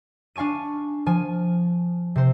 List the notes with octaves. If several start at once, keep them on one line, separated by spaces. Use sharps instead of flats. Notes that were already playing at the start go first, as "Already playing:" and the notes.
D4 F5 G#5 C#6 D#7
F3 G#5
C3 C5